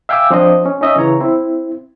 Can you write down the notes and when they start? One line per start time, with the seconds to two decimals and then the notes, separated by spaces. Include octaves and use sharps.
0.09 E5 F5 G5 G#5 D6 E6
0.31 F3 C4 D4 C5 D#5
0.66 C#4
0.81 C#4 D#4 D#5 E5
0.96 C#3 E3 C#5 A#5
1.20 C4 E4